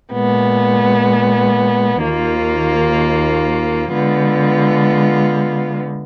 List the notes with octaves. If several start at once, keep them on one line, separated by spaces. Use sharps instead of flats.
A#2 G#3 B3
D#2 D#3 A#3 F4
D3 G#3 B3 F4